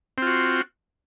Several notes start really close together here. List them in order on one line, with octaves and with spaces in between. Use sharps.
C4 F4 F#4